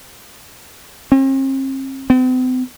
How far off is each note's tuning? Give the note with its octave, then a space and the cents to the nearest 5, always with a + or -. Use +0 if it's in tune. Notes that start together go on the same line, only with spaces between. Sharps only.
C4 +45
C4 -45